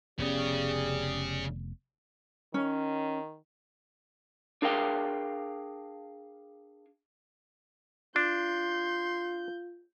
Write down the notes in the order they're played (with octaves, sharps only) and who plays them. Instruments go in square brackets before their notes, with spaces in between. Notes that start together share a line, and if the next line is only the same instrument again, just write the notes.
[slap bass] F1 B3 [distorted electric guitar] C#3 [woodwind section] G4 G#4 D5
[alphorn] D#3 [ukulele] C#4
[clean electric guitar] D4 G#4 A#4 F5 G5
[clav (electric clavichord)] D4 [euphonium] F4 [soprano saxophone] C6 [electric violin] G6